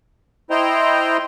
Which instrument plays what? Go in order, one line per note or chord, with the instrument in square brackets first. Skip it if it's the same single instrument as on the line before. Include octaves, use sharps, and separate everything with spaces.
[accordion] E4 C5 D#5 G5 A#5 C6